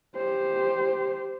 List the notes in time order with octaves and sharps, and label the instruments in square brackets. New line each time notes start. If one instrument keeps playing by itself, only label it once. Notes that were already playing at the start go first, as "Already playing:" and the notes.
[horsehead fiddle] G4 C5